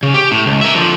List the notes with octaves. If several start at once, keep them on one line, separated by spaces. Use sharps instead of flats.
C#3
G4
A2
C#2
A#4 E5
D3 F3